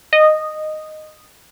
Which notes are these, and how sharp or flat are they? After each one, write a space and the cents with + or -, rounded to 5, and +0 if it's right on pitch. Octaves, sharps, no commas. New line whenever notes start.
D#5 -10